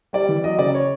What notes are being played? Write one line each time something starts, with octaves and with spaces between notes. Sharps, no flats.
G3 D5
E3
F#3 D#5
C#3 D5
C#5